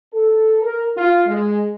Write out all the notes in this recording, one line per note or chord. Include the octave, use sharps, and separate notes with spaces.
A4
A#4
F4
G#3